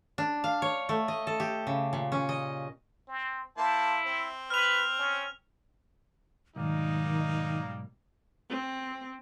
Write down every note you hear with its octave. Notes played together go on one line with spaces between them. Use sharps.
D4
F5
C#5
A3
D#5
A4
G4
C#3
A#2
C#4
D#5
C4
A#3 E4 C5 A5
C4
B4 F6 F7
C#4
B1 G#2 D#3 G3 A#3 D#4
C4